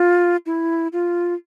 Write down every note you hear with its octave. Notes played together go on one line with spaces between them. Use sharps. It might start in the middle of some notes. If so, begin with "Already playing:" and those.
Already playing: F4
E4
F4